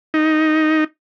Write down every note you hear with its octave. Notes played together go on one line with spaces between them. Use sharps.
D#4